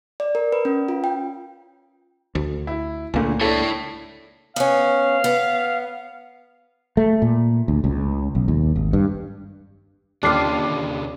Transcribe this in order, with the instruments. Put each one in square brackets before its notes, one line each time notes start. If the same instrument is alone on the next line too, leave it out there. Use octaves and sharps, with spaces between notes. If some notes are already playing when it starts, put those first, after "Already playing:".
[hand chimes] D5
A#4
B4
C#4
F4
G5
[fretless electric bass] D2
[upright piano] E4
[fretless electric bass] C#2 A#3 [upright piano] A#2 D3 A3
[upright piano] D4 A4 [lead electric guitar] E4 C#5
[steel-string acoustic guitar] B3 C#4 [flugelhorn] F5
[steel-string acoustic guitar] B3
[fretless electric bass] A3
A#2
D2
C#2
B1
D#2
G#1
G2
[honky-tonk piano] D#2 D6 C7 [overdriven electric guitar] D3 C#4 [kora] D4 F4